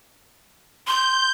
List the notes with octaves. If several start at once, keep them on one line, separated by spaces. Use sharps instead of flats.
C6 G6